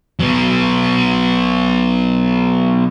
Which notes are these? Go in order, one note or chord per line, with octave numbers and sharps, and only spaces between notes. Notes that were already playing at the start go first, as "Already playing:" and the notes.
F#3 B3